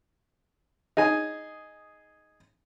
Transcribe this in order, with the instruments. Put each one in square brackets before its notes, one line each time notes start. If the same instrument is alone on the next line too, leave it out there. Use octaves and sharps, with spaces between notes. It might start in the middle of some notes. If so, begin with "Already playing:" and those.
[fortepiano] D#4 G#4 G#5